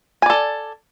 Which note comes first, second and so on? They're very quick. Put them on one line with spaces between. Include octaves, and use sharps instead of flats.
G#5 D5 A4